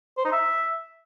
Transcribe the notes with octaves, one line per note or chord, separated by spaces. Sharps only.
C5
D#4
E5